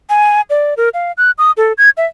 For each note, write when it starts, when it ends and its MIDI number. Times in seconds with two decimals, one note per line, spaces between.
0.10 0.41 80
0.50 0.74 74
0.77 0.89 70
0.94 1.12 77
1.18 1.31 90
1.38 1.52 87
1.57 1.73 69
1.78 1.90 92
1.97 2.06 76